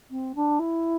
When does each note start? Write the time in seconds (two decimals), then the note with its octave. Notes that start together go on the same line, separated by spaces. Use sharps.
0.11 C4
0.36 D4
0.59 E4